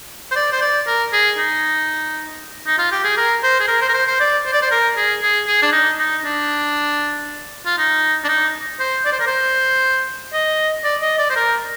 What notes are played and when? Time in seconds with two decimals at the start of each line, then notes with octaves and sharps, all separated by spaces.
0.31 C5
0.36 D5
0.52 C5
0.61 D5
0.87 A#4
1.13 G#4
1.39 D#4
2.67 D#4
2.78 F4
2.92 G4
3.04 G#4
3.17 A#4
3.43 C5
3.60 G#4
3.68 A#4
3.82 C5
3.89 A#4
3.94 C5
4.07 C5
4.20 D5
4.46 C5
4.53 D5
4.62 C5
4.71 A#4
4.97 G#4
5.22 G#4
5.47 G#4
5.62 D4
5.73 D#4
5.99 D#4
6.25 D4
7.66 F4
7.78 D#4
8.24 D4
8.28 D#4
8.80 C5
9.06 D5
9.13 C5
9.20 A#4
9.27 C5
10.33 D#5
10.84 D5
11.02 D#5
11.18 D5
11.30 C5
11.36 A#4